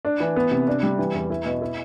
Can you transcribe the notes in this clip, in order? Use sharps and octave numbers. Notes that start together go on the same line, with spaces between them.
D4
E3
B3
C3
D4
G3
E3
E2
E4
B2
E4